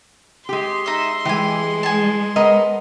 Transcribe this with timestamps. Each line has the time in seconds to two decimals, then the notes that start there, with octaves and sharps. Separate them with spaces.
0.49 G#3 G4 C6
0.86 D#4 E5
1.25 E3 G#3 G4 G#5
1.83 G#5 A5
2.36 B3 A#4 D#5